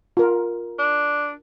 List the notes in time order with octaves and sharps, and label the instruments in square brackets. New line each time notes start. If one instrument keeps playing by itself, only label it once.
[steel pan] F4 A#4
[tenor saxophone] D4